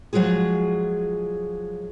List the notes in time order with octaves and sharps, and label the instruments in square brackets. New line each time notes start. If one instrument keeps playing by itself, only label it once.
[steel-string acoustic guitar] F3 F#3 G#3 F4 G#4